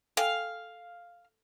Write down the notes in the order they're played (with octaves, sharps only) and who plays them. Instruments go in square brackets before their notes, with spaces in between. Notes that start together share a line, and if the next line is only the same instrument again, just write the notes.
[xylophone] A4 G5 G#5 [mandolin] F5